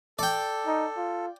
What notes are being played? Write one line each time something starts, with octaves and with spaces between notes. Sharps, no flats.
A4 D5 G5
D#4
F4